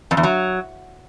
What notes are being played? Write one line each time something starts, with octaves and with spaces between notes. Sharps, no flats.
F2
E2
F#3